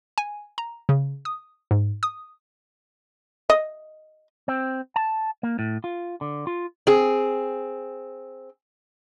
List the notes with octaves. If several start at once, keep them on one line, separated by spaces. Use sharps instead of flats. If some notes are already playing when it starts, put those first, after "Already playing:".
G#5
A#5
C#3
D#6
G#2
D#6
D#5
C4
A5
A#3
A2
F4
D3
F4
C4 G#4